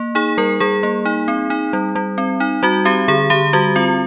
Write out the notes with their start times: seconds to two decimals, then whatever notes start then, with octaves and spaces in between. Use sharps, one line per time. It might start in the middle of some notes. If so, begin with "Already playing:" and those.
Already playing: A#3
0.15 D#4 G#4
0.38 G3 A#4
0.60 G3 G#4
0.83 A#3
1.05 D#4
1.28 C4
1.50 D#4
1.73 G3
1.95 G3
2.18 C4
2.40 D#4
2.63 G3 F#4
2.85 C4 G4
3.08 D3 G#4
3.30 D3 G4
3.53 G3 F#4
3.76 C4 F4